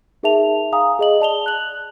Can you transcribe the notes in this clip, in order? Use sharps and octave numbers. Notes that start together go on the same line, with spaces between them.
D#4 G#4 A#4 E5 A5 F7
F5 G#5 A#5 D#6
G#4 D#5 F#7
D5 A5 F7 G7
F#6 F#7